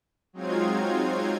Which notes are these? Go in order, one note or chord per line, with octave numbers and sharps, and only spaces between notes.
F#3 G#3 C4 D#4 F4 G#6